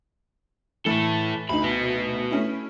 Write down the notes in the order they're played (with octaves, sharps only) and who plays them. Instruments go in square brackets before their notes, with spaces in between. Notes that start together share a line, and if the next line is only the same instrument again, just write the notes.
[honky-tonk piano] E3 A3 [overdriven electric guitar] E4 A4
[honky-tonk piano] D2 D#4 [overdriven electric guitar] B5
[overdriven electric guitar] F#4 B4
[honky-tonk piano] A3 C#4 E4